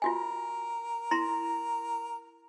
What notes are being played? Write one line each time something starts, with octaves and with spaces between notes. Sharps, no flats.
F4 F#4 A#4 G#5
E4 A#5 C6